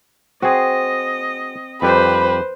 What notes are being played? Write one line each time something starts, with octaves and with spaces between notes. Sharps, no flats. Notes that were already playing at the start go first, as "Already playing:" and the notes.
C4 F#4 G#4 D#5
F2 G3 G4 B4 C5 B5